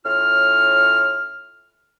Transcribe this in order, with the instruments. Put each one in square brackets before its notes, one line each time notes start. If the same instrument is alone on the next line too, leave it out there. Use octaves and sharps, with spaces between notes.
[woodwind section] A2 C#4 F4 F6